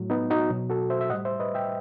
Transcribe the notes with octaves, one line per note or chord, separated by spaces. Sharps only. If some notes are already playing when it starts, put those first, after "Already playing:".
Already playing: A2 F#3
B3 D#4
D#4 F#4
B2 F#3
F#4 A4
C5 E5
E5
A2 G3 D#5 F#5
C5 E5
B4 D#5
E5 G5